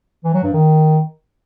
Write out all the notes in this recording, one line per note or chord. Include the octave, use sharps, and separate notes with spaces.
E3
F#3
G2
D#3